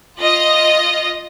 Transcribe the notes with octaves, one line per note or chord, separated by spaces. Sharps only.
F4 D#5